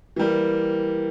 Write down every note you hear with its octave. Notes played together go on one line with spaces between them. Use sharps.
E3 G3 A#3